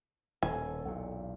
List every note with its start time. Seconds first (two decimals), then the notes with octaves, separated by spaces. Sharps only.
0.43 D#1 D#2 B2 A4 G#5
0.85 B1 E2 A#2